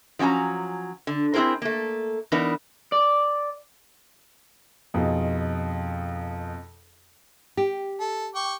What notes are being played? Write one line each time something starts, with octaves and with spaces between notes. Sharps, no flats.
F3 F#3 C#4 G#5 A#5
D3
C4 E4 F4 G#4 A#4 C5
A3 A#3
E3 B3 D4 D#4 A#4 B4
D5
F2 B2 D#4 G#4
G4
A4
G5 C#6 D6